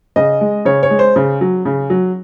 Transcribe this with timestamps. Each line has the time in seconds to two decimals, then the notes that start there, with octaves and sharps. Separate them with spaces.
0.16 C#3 D#5
0.41 G#3
0.65 C#3 C#5
0.83 C#5
0.90 G#3
0.99 C5
1.16 C#3
1.41 F#3
1.65 C#3
1.90 F#3